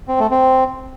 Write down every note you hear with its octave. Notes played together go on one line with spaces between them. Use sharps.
C4
A3
C4